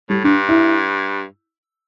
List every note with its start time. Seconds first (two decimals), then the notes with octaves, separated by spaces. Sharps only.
0.09 A2 G3
0.24 G2 D4
0.49 E4